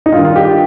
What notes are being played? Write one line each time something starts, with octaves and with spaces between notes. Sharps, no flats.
D#4
G2 D#3 F4
F4
G4